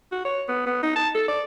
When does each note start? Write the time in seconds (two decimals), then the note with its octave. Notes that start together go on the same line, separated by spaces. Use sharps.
0.12 F#4
0.25 C#5
0.48 B3
0.66 B3
0.83 D#4
0.96 A5
1.15 A4
1.28 D5